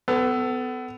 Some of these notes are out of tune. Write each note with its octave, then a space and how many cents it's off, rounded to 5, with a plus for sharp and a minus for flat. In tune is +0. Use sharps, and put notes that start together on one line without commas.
B3 +30 A4 +0